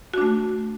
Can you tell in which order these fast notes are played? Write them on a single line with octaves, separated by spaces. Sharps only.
F#4 D4 A3